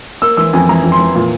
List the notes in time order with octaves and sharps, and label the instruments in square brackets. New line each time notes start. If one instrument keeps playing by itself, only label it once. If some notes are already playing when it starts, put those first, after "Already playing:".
[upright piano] A#3 E6
E3 E6
F2 G#5
E3 A#5
F2
C6
E3
A#2